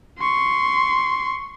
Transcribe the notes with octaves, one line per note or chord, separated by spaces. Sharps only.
C6 C#6